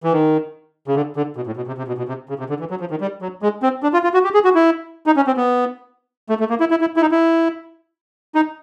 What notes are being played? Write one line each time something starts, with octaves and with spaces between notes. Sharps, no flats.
E3
D#3
C#3
D3
D3
B2
A2
B2
C3
C3
B2
B2
C3
C#3
C3
D3
E3
F#3
F3
D#3
G3
F#3
G#3
C4
D4
F4
F4
F#4
G4
G#4
F#4
E4
D#4
C#4
C4
B3
A3
A3
A#3
E4
E4
E4
E4
D#4
E4
D#4